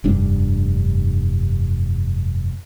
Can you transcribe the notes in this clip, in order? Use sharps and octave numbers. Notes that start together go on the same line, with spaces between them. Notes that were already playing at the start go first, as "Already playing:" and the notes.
F1 G2 D4